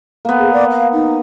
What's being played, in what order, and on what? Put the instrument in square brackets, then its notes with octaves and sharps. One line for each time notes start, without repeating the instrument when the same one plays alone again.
[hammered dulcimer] A#3 B3
[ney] G#4
D5
F5
D#4